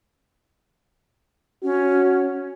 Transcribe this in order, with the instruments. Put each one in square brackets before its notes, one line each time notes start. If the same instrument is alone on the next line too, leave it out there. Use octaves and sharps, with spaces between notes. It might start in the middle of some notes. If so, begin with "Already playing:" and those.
[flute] C#4 [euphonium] F#4